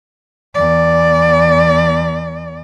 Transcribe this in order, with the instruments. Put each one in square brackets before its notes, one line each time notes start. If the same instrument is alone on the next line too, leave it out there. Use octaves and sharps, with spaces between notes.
[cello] E2 D5